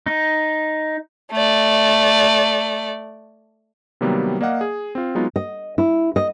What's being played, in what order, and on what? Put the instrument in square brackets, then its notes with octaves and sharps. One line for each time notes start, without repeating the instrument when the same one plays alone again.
[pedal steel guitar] D#4
[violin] A3 D5
[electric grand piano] C3 D#3 F#3 G3 A#3 B3
A#3 D5 D#5 F5 F#5
G#4
C4 F4
F#3 G#3 B3 D#4 F4
[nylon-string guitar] D#5
E4
D#5